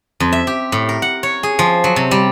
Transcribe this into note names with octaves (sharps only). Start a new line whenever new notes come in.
F2
E5
G4
A2
A#4
F#5
C#5
G#4
F3
F#3
C3
G3